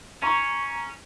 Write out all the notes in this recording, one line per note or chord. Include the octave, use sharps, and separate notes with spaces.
C#4 A#5 C#6